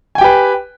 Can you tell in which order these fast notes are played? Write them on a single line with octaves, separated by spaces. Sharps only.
G#5 G5 G4 B4